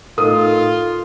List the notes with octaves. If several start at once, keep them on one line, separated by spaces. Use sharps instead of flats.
A2 D#4 F4 A4 A#4 D#6